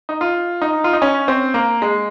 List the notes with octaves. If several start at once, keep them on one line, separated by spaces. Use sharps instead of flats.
D#4
F4
D#4
F4
D#4
C#4
C4
A#3
G#3